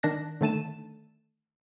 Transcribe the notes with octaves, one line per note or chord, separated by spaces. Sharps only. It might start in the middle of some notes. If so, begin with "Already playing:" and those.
D#3 D4 F#6 A#6
D3 D#3 A3 A5 D#7 E7